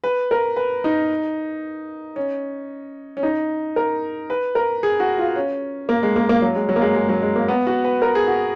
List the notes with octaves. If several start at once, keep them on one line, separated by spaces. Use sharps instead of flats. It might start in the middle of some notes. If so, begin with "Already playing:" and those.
B4
A#4
B4
D#4
C#4
C#4
D#4
A#4
B4
A#4
G#4
F#4
F4
C#4
A#3
G#3
A#3
A#3
F#3
G#3
F#3
A#3
G#3
G#3
F#3
G#3
A#3
B3
F#4
B4
A#4
G#4
F#4